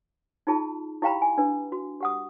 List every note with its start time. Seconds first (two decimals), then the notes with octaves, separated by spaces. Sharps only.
0.47 D#4 F4 G#4 A5
1.02 E4 G4 F5 G5 A#5 B5
1.22 G#5
1.38 D4 B4
1.72 F#4
2.01 G4 F#5 D#6